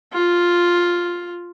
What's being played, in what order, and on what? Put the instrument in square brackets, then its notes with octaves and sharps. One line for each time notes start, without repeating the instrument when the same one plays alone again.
[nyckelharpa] F4